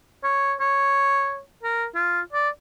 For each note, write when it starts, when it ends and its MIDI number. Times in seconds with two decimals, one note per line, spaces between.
0.24 0.54 73
0.60 1.40 73
1.63 1.86 70
1.95 2.21 65
2.32 2.49 74